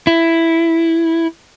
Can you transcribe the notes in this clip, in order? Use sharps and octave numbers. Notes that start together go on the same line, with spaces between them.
E4